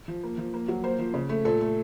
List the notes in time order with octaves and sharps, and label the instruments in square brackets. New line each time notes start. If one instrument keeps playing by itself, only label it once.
[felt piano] F3
A#3
F3
A#3
F#3
A#3 C5
F3
C#3
A3
A#2 A4
A3